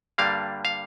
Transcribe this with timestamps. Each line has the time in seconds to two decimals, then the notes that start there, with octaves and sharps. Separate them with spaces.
0.18 G2 D3 G3 A#3 D4 F5
0.65 F5